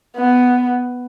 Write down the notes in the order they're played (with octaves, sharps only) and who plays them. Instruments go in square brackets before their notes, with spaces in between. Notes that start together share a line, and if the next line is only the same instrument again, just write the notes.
[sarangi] B3